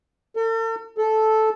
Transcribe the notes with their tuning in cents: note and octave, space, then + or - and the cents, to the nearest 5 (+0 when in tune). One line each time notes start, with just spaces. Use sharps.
A4 +45
A4 -10